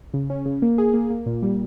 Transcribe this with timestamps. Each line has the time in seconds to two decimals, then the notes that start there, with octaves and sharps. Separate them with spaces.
0.14 C#3
0.30 C#4
0.46 C#3
0.62 A#3
0.78 G#4
0.94 A#3
1.10 A#3
1.26 A#2
1.43 G3